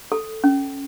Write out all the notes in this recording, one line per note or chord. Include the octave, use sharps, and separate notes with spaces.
A4
C#4